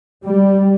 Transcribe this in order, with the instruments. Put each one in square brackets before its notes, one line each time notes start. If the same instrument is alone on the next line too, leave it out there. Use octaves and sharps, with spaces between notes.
[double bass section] G3